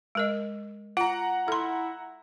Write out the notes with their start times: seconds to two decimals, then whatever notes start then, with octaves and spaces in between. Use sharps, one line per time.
0.15 G#3 A#4 D#5
0.97 F4 F#5 A#5
1.48 E4 A4 C6